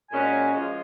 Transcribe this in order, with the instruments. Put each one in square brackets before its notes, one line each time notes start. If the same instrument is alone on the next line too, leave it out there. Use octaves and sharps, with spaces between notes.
[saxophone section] A#2 G#3 C#4 F#4 [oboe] G#5
[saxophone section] F3 G#3 C#4 F4